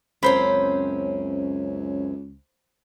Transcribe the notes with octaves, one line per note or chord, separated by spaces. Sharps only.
C#2 F#2 C4 C#4 C5 B5